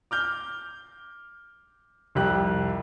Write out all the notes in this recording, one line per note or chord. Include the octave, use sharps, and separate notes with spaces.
D6 F6 G6
C2 F2 G4 F#6